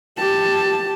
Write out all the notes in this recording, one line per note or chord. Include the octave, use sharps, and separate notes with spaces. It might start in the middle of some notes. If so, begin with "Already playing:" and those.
G4 A5